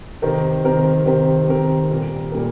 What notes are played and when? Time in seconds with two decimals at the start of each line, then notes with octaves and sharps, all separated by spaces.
0.22 C3 D#3 C4 G4 A#4
0.64 C3 D#3 C4 G4 A#4
1.06 C3 D#3 C4 G4 A#4
1.49 C3 D#3 C4 G4 A#4
1.90 A#2 G3 A#3 G4 A#4
2.32 A#2 G3 A#3 G4 A#4